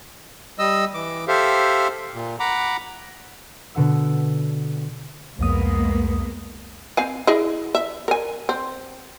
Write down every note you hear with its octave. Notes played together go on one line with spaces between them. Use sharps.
G3 D#5 E6
E3 D6
G4 A4 C5 E5 F5
A#2
F#5 A#5 B5 D6
B2 D3 F#5 E6
C2 F2 G#3 A#3 B3 D#6
C4 F5 G#5
E4 G#4 D#5
E5
A#4 G#5
C4